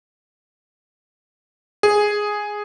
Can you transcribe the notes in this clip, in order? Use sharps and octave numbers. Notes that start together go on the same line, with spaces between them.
G#4